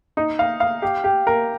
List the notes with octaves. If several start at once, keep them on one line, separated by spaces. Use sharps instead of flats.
D#4
F5
F5
G4
G4
A#4